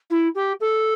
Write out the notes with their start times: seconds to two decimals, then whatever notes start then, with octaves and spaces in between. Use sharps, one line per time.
0.10 E4
0.35 G4
0.60 A4